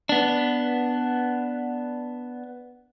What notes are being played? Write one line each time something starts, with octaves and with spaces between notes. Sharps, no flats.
B3 D4